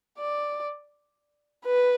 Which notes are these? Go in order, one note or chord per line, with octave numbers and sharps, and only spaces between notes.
D5
B4